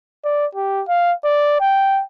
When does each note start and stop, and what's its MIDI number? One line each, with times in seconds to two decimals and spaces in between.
0.25 0.46 74
0.55 0.83 67
0.88 1.13 77
1.24 1.60 74
1.60 2.02 79